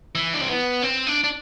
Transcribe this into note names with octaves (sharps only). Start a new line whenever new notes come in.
E3
D4
C4
B3
C4
D4
D4